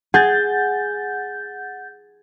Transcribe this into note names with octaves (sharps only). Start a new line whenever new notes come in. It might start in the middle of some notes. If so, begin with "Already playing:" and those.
G#4 F#5 G6 A6